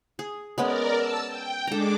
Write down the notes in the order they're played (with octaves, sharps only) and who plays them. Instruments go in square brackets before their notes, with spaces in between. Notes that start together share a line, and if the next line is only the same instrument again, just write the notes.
[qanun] G#4
[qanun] G#3 B3 C#4 [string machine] A#4 D5
[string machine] A5 E6
G5
[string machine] G#3 D4 D6 [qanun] A4 A#5